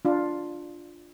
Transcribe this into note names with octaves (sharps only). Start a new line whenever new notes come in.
D4 F4